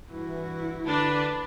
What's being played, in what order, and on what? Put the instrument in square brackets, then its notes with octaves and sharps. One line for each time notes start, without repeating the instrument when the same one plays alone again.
[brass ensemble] G2 E3 [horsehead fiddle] E4 F#4
[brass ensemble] D3 [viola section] D4 [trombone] B4